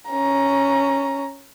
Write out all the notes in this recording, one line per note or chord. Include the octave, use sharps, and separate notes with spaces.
C#4 A#5